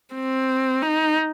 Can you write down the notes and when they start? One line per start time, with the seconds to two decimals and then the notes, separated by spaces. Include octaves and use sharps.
0.14 C4
0.82 D#4